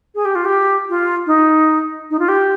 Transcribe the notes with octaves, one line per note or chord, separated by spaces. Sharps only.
G#4
G4
F4
G4
F4
D#4
D#4
F4
G4